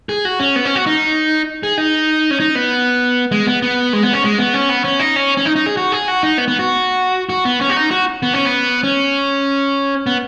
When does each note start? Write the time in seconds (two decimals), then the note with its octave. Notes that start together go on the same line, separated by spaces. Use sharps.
0.09 G#4
0.25 F#4
0.40 C#4
0.56 B3
0.65 C#4
0.75 F#4
0.86 D#4
1.63 G#4
1.78 D#4
2.31 C#4
2.40 D#4
2.55 B3
3.32 G#3
3.47 B3
3.62 B3
3.93 G#3
4.03 B3
4.13 C#4
4.24 G#3
4.38 B3
4.54 C#4
4.69 B3
4.84 C#4
4.99 D#4
5.16 C#4
5.37 C#4
5.45 D#4
5.56 D#4
5.66 G#4
5.77 F#4
5.92 G#4
6.08 F#4
6.23 D#4
6.38 B3
6.48 B3
6.59 F#4
7.29 F#4
7.45 B3
7.61 C#4
7.70 F#4
7.76 D#4
7.91 F#4
8.23 B3
8.34 C#4
8.45 B3
8.84 C#4
10.07 B3